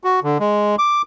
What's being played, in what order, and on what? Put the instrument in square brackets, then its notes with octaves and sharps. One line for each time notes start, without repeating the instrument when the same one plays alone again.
[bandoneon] F#4
D3
G#3
D6